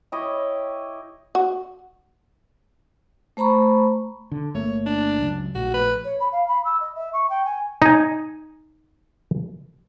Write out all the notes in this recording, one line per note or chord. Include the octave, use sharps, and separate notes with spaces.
E4 G4 C#5 D#5
F#4
A3 C5 A#5 B5 C#6
D3
G1 A3 A#3 C#5
D4
C#2 F#2
A#1 A2 F#4
B4
C#5
B5
F5
B5
E6
D#5
E5
C#6
G5
G#5
D#4 G#5